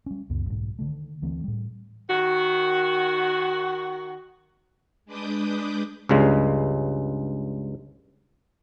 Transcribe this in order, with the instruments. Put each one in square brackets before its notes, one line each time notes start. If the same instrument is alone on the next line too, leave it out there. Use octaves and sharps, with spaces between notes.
[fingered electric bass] G3 C#4
C#2 F#2 B3
B1 G#2
D3 D#3 A3
D2 E3 A3 C4
A2 G3
[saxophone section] D#3 F#4
[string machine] G#3 D4 B4 D6 D#6 G6
[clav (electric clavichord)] C#2 G2 C#3 G#3